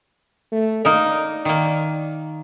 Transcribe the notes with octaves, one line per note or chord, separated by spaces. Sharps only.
A3
A#3 D#4 A#4 D5
D#3 A#3